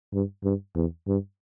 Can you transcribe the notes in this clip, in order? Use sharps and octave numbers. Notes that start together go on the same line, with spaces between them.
G2
G2
E2
G2